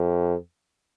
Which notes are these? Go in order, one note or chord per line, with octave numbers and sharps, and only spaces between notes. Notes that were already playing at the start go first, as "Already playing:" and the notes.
Already playing: F2